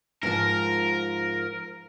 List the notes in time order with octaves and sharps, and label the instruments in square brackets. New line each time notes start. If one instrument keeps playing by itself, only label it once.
[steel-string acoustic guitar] G#2 F3 [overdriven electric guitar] A#4